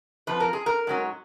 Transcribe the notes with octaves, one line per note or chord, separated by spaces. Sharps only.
F2 F3 B4
A#4
G#4
A#4
G#2 F#3 C#4